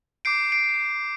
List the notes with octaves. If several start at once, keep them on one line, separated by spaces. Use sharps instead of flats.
D6 G6 C7 D7
C7 D7